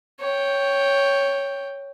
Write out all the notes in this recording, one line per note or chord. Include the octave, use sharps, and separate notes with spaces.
C#5 G5